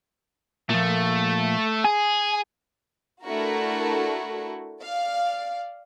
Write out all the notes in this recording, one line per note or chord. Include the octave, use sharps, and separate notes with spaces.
A#2 F3 A3
G#4 G#5
A3 D4 E4 F#4 A#4
D5 F5